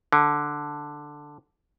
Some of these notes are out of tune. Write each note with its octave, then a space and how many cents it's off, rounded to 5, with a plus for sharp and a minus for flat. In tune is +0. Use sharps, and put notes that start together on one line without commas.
D3 +5